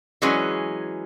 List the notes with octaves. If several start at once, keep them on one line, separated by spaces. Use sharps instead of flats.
E3 F#3 G#3 C#4